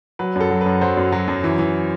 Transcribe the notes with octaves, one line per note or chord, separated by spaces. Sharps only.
F#3 B4
F#2 A4
F#3
F#2 B4
F#3 C5
F#2
F#3
F#2
E3
E3